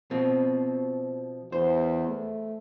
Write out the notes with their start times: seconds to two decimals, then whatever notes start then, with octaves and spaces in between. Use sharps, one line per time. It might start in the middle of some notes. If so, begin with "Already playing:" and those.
0.11 B2 F3 C4
1.52 E2 C5
2.08 A3